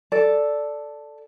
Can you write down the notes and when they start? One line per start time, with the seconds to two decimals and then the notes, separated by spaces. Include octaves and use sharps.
0.12 A4 D5